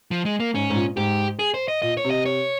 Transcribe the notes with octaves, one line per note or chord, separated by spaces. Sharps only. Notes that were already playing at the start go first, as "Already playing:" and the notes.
F3
G#3
A#3
G#2 C#4
G#2
A#2
G#2 G4
G#4
C5
D#5
A#2 D#5
C#5
C3
D#5
C#5